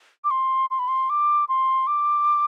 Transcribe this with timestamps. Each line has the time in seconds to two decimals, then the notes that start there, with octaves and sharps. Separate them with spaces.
0.24 D6
0.31 C6
0.70 C6
0.79 B5
0.88 C6
1.10 D6
1.49 C6
1.87 D6